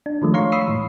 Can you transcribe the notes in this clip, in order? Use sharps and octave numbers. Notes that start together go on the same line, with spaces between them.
D4
D#3 F3 G#3 A3
C#5 F5 A#5 C6 C#6
B5 C#6 D#6 E6 C7
A2 E3